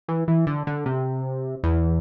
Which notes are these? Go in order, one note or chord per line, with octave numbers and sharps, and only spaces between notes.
E3
E3
D3
D3
C3
E2